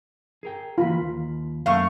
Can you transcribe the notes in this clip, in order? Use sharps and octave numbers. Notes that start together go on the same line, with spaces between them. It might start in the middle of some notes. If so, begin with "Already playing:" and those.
G#4 A#4 G5
E3 A#3 F4 A#4 B5
D#2
F#2 A3 A#3 F5 C6 C#6